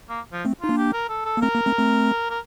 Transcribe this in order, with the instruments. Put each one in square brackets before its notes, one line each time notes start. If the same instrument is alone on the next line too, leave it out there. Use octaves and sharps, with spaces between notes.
[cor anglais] A#3
F3
[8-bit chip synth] A3 C4
[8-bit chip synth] D#4 [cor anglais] F4
[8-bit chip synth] A#3 D4
[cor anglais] G4
A#4
A4
A4
[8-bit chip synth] A#3
[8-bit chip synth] A3 C4 [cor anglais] A#4
[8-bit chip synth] A#3
A3 C4
A3 C4
[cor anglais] A#4